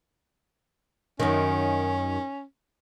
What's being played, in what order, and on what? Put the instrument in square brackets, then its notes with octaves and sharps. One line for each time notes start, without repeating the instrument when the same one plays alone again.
[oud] F#2 D#3 [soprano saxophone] C#4